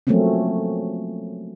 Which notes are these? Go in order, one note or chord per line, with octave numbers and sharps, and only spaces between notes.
F3 F#3 A3 A#3 C4 C#4